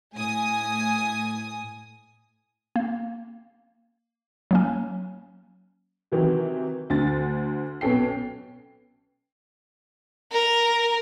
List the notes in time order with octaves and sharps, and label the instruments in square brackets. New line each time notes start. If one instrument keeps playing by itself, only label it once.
[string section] A2 G#5 D#6
[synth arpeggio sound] A#3
F#3 A#3 C#4
[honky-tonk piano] C3 D#3 E3 F#3
D2 D3 A6
B1 B3 C#4 A4 G5 C7
[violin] A#4